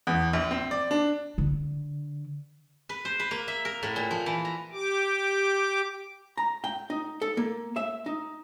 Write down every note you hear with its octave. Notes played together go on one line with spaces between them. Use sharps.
E2
A#1
C4
D5
D4
D3
B4
C5
B4
A#3
E5
A#4
A2
A#2
F3
E3
A#5
G4 D6
A#5
G5
D#4
A4
A#3
E5
D#4